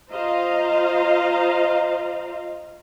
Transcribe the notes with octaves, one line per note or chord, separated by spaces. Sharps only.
F4 C5 D#5 F5 A#5